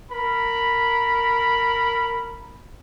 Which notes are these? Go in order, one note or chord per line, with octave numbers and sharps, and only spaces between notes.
A#4 B5